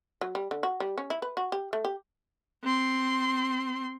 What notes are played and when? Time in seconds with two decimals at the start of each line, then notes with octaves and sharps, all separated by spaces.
0.21 F#3
0.35 G3
0.51 D3
0.63 F#4
0.80 G3
0.98 C#4
1.10 E4
1.22 B4
1.37 F#4
1.52 G4
1.73 A3
1.85 G4
2.63 C4 C6